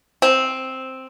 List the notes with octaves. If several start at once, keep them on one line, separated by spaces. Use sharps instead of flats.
C4